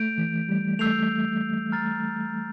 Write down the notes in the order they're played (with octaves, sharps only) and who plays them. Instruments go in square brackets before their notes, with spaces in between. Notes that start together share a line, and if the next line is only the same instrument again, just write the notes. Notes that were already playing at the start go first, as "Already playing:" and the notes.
Already playing: [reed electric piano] A3 [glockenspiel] G6 D7 F7
[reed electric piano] E3
G3
[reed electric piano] A3 [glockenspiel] E6 G6 C7 F7
[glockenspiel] A#5 F6 A6 C7